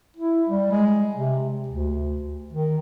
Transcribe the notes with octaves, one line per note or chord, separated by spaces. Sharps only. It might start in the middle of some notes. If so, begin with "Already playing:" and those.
E4
G3
G#3
C3
D2
D#3